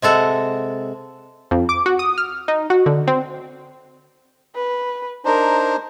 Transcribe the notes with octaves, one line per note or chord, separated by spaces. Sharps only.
C3 G#3 A4 F#5
F2
D6
F#4
D#6
F6
D#4
F#4
D3
C4
B4
D4 D#4 A#4 C5